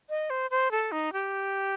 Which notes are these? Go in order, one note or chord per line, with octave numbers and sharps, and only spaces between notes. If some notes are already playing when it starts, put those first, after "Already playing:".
D#5
C5
C5
A4
D#4
G4